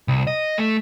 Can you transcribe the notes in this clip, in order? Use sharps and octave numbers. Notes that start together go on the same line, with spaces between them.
C2
D#5
A3